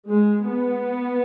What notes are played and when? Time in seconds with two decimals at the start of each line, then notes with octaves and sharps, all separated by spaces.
0.10 G#3
0.48 B3